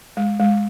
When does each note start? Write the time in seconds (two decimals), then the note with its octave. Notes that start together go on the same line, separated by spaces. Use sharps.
0.17 G#3
0.40 G#3